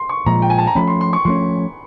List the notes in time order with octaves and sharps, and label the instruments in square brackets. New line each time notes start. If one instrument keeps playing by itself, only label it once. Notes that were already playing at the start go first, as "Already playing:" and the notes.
Already playing: [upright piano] C6
C#6
[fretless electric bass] A#2 F3 G#3 [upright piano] A#5
[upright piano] G5
G#5
A5
A#5
[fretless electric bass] F3 A3 C#4 [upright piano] B5
[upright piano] C6
C6
C#6
[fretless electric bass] F3 A3 C#4 [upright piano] C6